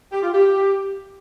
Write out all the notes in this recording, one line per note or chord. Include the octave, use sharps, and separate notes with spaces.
G4
F4
G4